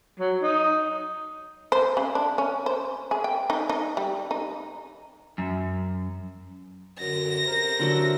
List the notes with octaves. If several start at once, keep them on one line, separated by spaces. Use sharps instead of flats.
F#3
D#4
C5
C#3
D4
C#4
C5
G#4
G5
D#4
D#4
G3
D#4
F#2
F#2 D3 A#6
C3 A#4 C5
D3 F#3 E5